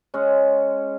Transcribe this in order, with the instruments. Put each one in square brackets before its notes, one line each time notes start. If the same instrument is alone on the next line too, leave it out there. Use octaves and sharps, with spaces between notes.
[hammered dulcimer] G#3 C#4